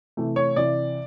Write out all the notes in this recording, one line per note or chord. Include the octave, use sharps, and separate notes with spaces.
C3 E3 A3
C#5
C3 E3 D5